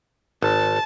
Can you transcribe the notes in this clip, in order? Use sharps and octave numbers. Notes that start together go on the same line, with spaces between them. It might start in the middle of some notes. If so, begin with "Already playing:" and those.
G#1 A5